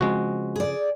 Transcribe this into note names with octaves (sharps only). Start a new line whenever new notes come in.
C#3 F3 G#3 C4 F#4
G#4 D5